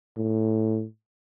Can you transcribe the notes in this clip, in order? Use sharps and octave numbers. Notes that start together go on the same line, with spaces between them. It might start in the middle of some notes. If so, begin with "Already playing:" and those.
A2